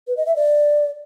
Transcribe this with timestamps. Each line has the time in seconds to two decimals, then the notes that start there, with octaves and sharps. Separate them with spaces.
0.07 B4
0.17 D#5
0.26 E5
0.36 D5